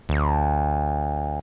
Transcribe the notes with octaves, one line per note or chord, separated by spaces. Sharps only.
D2